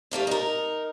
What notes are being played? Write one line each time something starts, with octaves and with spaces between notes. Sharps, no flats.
G3 A3 A#3 C4
D#4 A#4